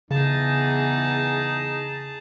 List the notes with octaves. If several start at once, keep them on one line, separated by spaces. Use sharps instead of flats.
E2 C#3 D#4 G#4 A5